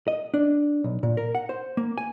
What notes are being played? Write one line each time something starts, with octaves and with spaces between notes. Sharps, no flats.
D#5
D4
B1
A#2
A#4
F#5
C5
A#3
G#5